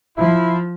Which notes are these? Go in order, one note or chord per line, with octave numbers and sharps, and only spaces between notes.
F3 E4